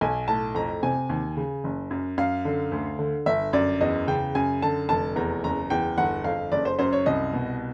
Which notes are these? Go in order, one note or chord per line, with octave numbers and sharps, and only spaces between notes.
B1 G#5
A2 A5
F2 A#5
C3 G#5
D#2
C#3
F#1
F#2
F#2 F5
D3
D2
D3
G1 E5
F#2 D5
E2 D#5
C#3 G5
F#2 G#5
D3 A5
F1 A5
E2 A#5
F#1 A#5
E2 G5
G1 F#5
F2 F5
F#1 D5
C5
F#2 C5
C#5
C2 D#5
B2